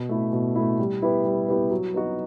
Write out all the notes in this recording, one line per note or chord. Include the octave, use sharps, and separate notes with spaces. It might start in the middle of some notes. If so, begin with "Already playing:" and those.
Already playing: B2
A3 E4
B2
A3 E4
G3
B3 E4 G4 B4
G3
B3 E4 G4 B4
F#3
B3 D#4 F#4